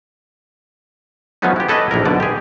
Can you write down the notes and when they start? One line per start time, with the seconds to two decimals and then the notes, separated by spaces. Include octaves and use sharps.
1.42 F3 F#3 A3 B3 C#4 D#4
1.56 E4 G4
1.69 G#4 A4 B4 C#5 D#5 E5
1.91 A#1 E3 A#4
2.05 B1 B2 D3 D5
2.20 G4 G#4